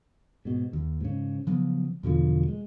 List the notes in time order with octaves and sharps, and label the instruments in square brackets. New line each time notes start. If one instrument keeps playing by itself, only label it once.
[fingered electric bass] G#2 B2
D#2
G#2 C#3
C#3 F3 F#3 B3
E2 B2 D3 F3
G#3